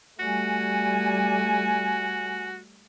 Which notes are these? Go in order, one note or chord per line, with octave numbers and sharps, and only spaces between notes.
G3 A3 F#4 G#5